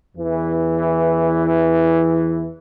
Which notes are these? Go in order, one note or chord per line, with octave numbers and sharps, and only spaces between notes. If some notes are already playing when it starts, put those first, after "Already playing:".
E2 E3